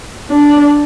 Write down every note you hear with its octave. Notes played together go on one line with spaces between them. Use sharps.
D4